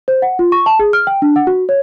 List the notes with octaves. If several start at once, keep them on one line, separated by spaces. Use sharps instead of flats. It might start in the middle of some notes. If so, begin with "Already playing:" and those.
C5
F#5
F4
C#6
A5
G#4
F6
G5
D4
F#5
F#4
C#5